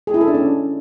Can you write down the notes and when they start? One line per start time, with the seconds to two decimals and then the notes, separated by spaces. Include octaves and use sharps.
0.07 G#4
0.14 E4
0.21 A4
0.28 D4
0.35 C#4